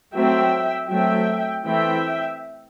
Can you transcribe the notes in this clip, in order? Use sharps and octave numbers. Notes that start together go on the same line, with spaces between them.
F#3 A3 C4 E5 G5
F#3 A3 C4 E5 G5
E3 A3 C4 E5 G5